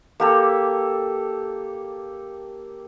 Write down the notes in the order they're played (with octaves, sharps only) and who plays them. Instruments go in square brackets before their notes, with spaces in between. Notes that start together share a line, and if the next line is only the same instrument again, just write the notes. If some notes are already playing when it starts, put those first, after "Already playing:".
[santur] A#3 G4 A4